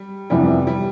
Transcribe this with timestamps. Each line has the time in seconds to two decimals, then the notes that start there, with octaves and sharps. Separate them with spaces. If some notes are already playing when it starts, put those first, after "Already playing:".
Already playing: G3
0.30 F2 C3 E3 G3 B3 D4
0.67 G3